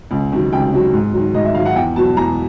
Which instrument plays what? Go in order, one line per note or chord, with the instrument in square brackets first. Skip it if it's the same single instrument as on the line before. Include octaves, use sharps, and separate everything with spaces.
[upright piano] C#2
C3 D#3 F#3
C#2 G5
C3 D#3 F#3
G#2
D#3 F#3
G#2 D#5
E5
D#3 F#3 F5
F#5
E2 G5
B2 F#3 A5
E2 A#5